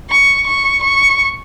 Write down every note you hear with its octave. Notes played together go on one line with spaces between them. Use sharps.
C#6
C#6
C#6